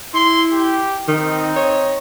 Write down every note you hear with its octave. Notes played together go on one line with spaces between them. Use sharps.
E4 C6
G4
D#3 C4 D#4
C#5